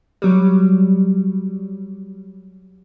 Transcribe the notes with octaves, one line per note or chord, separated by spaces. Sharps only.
F#3 G3